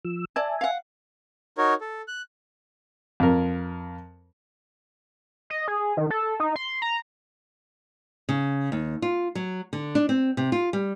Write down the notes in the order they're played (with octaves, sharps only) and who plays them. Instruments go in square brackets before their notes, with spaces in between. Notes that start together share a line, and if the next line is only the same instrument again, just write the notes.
[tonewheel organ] F3 E6
[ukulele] D5 A5 [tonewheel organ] E5 G#5
[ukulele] F5 F#5
[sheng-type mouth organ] D#4 F#4 A#4 C#5
A4
F#6
[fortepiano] F2 A#4
[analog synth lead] D#5
G#4
D#3
A4
D#4
C6
A#5
[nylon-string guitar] C#3
D#2
F4
F#3
D3
D4
C4
C3
F4
G3